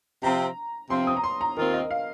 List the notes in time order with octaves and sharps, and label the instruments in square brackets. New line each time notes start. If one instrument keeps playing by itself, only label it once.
[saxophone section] C3 F3 C4 [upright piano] A#5
[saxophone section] C3 F3 C4 [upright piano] C6
[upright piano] D#6
A#5
C6
A#5
[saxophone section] D#2 D#3 C4 F4 [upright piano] A#4
[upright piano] D#5
F5